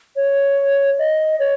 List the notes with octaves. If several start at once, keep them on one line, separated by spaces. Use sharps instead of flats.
C#5
D#5
C#5